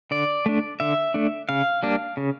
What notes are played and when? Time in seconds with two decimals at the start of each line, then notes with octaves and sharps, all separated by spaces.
0.11 D3 D5
0.46 A3 D4
0.80 D3 E5
1.14 A3 D4
1.49 C#3 F5
1.83 G3 A#3 D4
2.17 C#3